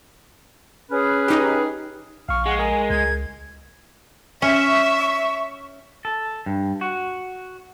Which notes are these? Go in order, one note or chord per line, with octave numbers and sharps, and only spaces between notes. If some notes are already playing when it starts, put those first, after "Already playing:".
C#4 G#4 B4
D#4 G4
A#1 F5 C#6 F6
G#3 F#5
G#4 A#4 G#5
C#2 G#6
C#4 E5 C#6
A4
G2
F#4